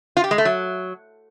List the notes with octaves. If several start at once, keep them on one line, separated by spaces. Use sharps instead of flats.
F4
G4
G#3
A3
F#3